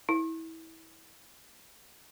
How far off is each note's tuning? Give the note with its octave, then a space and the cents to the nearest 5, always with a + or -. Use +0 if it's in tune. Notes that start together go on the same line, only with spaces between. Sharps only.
E4 -25